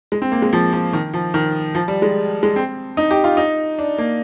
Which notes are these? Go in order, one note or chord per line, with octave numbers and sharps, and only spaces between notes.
G#3
C4
A#3
G#3
F3
F3
D#3
F3
D#3
F3
G3
G#3
G#3
C4
D#4
G4
F4
D#4
D4
A#3